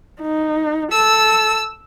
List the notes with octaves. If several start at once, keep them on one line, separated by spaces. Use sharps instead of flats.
D#4
A4 E6